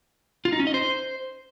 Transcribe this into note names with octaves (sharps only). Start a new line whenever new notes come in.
F4
D#4
C#4
D#5
C5